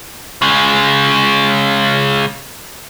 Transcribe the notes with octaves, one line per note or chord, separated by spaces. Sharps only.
C#3 G#3